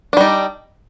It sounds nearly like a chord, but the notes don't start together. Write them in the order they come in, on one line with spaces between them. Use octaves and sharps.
D4 G3 D#4